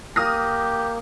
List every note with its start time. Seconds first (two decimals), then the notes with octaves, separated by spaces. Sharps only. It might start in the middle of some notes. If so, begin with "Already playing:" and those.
0.16 A#3 G4 D#6 F6 A#6